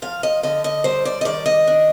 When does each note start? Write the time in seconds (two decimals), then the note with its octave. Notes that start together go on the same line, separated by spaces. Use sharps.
0.02 F3 F5
0.23 D#5
0.43 D3 D#5
0.64 D#5
0.84 G3 C5
1.05 D5
1.21 D#5
1.25 D#3 D5
1.46 D#5
1.67 D4